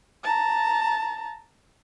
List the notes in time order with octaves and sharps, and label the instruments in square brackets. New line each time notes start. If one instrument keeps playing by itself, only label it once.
[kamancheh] A5 A#5